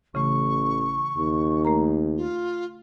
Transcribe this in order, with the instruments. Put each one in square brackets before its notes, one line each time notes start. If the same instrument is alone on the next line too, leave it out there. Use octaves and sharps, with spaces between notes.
[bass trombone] A1 [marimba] C#3 E3 A3 [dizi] C#6
[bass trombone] D#2
[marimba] A3 A#4 A#5
[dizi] F4